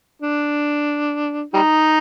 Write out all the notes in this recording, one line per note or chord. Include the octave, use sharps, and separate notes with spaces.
D4
G3 D#4